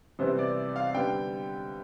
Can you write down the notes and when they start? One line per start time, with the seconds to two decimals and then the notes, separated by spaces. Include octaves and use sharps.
0.19 C3 E3 G3 B3 C5
0.39 D5
0.76 F5
0.95 D3 G3 B3 G5